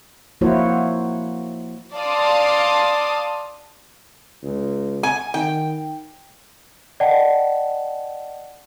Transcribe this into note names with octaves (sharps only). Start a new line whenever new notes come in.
F3 A#3 E4 F#4 C5 C#5
D5 F5 A5 C6 D6 D#6
C#2
G#5
D#3 G5
D5 D#5 F#5 G5 A5